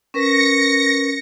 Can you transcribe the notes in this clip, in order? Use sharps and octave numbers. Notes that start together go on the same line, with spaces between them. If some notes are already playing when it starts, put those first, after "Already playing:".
C#4 A#4 B4 A#6 C#7